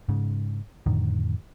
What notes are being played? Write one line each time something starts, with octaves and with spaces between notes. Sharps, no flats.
G#2 C#3
F2 A2 D3 D#3